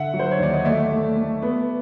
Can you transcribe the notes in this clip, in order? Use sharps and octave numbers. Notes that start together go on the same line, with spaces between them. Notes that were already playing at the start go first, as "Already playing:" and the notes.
Already playing: D3 E5 F#5
F#3
C5
C#5
D#2 D5
D#5
A3 D5 E5
A3
A3
B3